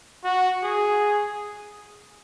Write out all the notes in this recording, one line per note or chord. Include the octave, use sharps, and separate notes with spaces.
F#4
G#4